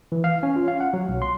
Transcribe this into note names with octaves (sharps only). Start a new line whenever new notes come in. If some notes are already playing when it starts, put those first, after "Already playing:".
E3
F5
C#4
F4
F5
F#5
F#3
B1
C6